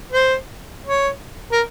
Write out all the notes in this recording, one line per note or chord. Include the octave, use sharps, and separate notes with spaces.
C5
C#5
A#4